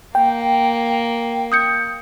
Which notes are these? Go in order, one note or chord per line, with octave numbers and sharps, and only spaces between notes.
A#3 G5
D#6 G6 C#7